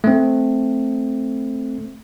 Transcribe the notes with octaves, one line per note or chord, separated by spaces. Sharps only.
A3 C4